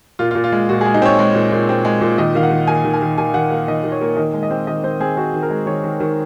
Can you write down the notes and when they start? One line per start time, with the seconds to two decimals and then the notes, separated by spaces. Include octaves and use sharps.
0.19 A#2 F4
0.31 F4
0.35 A#2
0.44 F4
0.52 G#3
0.69 A#2 F#4
0.81 G#3 G#4
0.94 D#4
1.02 C4 C#5
1.19 G#3
1.35 A#2
1.52 A#2
1.69 C4
1.85 G#3
2.01 A#2
2.18 D#3 D#5
2.35 D#3 F5
2.43 F#5
2.51 D#3
2.67 A#3 G#5
2.85 D#3
2.93 G#5
3.02 D#3
3.18 D#3 G#5
3.34 D#3 F#5
3.50 A#3 F5
3.68 D#3 D#5
3.84 D#3
3.92 C#5
4.01 A#3
4.17 D#3 D#5
4.33 G#3
4.43 D#5
4.51 C4
4.67 D#3 D#5
4.84 C4 C5
5.00 C4 G#4
5.17 C4 F#4
5.34 D#3
5.42 A#4
5.50 G#3
5.66 D#3 C#5
5.84 D#3
6.00 D#3